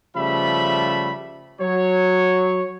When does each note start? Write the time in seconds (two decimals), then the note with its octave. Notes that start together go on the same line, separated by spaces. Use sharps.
0.16 C#3 F3 G3 A3 E5 B5
1.61 F#3 C#5